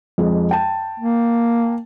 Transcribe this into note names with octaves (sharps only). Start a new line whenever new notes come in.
F2 G#3
G5 A5
A#3